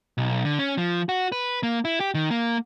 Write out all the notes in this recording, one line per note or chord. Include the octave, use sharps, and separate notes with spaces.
B1
D3
C#4
F3
F#4
B4
A#3
E4
G4
D#3
A#3